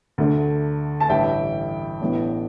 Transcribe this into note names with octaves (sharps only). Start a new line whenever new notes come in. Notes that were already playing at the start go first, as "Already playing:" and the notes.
D2 D3 A3 D4
A5
A1 G2 D3 G3 E5 G5
A1 A2 E3 B3 D4